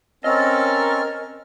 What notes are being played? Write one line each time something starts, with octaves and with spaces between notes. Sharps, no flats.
C4 C#4 A4 A#4 D#5 F6